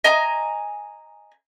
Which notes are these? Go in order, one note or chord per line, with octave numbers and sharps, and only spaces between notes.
D#5 G#5 A#5